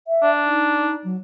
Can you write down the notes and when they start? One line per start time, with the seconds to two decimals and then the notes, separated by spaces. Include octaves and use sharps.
0.08 E5
0.23 D4
0.45 D#4
1.04 F#3